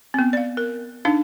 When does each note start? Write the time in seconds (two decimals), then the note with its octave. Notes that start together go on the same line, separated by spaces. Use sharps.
0.14 B3 C4
0.33 D5 F5
0.57 A#4
1.05 D4 D#4 F5